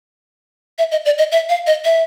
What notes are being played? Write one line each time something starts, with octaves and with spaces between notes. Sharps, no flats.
E5
D#5
D5
D#5
E5
F5
D#5
E5